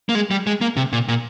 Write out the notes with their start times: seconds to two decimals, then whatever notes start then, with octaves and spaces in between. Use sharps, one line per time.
0.09 A#3
0.15 G#3
0.31 G3
0.47 G#3
0.61 A#3
0.77 C3
0.93 A#2
1.08 A#2